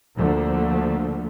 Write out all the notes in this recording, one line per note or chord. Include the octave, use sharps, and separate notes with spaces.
D2 D3 F3 A3 A#3